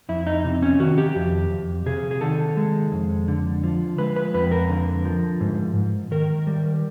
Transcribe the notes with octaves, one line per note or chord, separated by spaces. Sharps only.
F2 E4
D#4
C3
C#4
D#3 F#4
G4
F2
F2
C3 G#4
G#4
D#3 A4
G#3
F2
D3
F3
G#3 B4
B4
F2 B4
A#4
D3
F3
G#2
G#2
D#3 A#4
G3